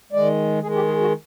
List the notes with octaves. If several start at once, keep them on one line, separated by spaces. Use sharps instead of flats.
D#3 G#3 D5
D#3 G#3 G#4
G4
G#4
F#4